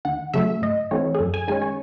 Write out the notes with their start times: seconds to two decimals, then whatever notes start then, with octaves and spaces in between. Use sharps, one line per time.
0.05 D#2 F#5
0.34 C#3 F#3 A3 E5
0.62 G#2 D#5
0.91 E3 A3 C4 C#5
1.15 G#4
1.19 F#2 A4
1.34 G#5
1.48 D#3 G#3 C#4 G#5
1.62 C#5